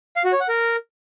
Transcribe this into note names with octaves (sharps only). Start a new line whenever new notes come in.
F5
F#4
C#5
F#5
A#4